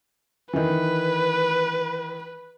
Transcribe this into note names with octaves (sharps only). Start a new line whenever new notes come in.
D#3 E3 B4